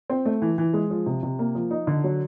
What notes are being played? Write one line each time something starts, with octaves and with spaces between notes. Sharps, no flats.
C4
A3
E3
E3
G#3
F3
C3
C3
A#3
F3
D#4
D3
F#3